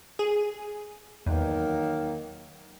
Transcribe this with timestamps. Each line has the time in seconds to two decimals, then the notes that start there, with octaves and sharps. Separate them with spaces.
0.19 G#4
1.26 E2 D#3 F#3 A#3